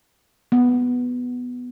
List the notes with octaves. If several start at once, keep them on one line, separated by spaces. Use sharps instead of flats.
B3